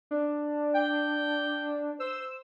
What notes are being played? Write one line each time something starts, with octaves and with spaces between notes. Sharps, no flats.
D4
G5
C5 E6